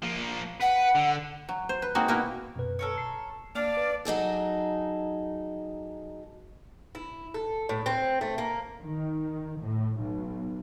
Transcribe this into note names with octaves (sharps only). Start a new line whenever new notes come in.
F3 A#3
B4 F#5
D3
F#3
C5
B4
G#3 A#3 C4 D#4 F#4
B2 A#3 D#4 E4 F#4 A#4
F#2 B2 B4
A4 A#4 C#5
C7
A#3 D4 D5 F5
B4
F#3 D#4 G#4 A4
E4
A4
A2
C4
A3
A#3
D#3
A2
B1